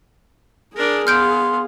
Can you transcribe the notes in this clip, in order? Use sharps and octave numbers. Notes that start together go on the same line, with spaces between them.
D4 G#4 A#4
B3 F5 C6 F6 G6 D7